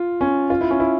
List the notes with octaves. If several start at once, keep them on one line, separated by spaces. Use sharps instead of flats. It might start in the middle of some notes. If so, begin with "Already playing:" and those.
Already playing: F4
C#4
F4
E4
C#4
E4